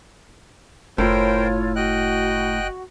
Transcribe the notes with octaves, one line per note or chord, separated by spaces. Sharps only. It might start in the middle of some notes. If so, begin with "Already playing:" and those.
F#1 A2 F4 A#4 C5 C#5 G5
F#4 D#5 G5 F#6